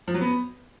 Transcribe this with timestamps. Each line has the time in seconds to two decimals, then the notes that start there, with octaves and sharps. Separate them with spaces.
0.08 F3
0.14 F#3
0.21 B3